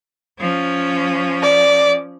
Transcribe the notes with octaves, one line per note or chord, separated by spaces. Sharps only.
F3 C#4
D5